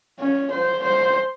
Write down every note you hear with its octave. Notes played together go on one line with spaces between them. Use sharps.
C#4
C5
C5